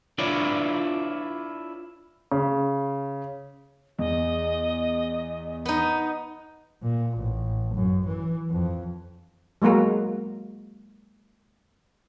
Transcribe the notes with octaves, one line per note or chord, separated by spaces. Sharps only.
D4 E4 F4 B4 C#5 D5
C#3
E2 D#5
B3 D#4
A#2
A1
F#2
E3
F2
F#3 G#3 A#3 F#4 A#4